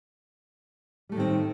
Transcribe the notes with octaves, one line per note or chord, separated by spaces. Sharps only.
A2 D#3 G3 A3 C4